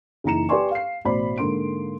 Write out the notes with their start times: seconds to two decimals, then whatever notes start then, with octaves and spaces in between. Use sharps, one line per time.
0.24 F#1 E3 D#4 A#5 C#7 E7
0.49 G4 B4 D5 G#5 C6 C#6
0.71 F5 C7
1.05 A1 B2 C5 D5 B5
1.38 G#2 D3 A#3 C6 D7